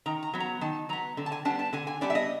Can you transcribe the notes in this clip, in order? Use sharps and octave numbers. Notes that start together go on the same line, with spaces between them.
D#3 A#5
A#5
F#3 B3
A#5
D#3 A5
F#3 B3 A#5
D3
A5
G#5
G3 B3 D4 A5
A5
D3 G#5
G#5
G3 B3 D4 D5
E5
D#5